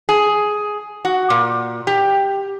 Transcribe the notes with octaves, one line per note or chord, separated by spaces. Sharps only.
G#4
F#4
A#2
G4